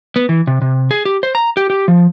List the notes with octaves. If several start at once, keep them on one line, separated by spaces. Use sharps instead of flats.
B3
E3
C3
C3
G#4
G4
C5
A#5
G4
G4
F3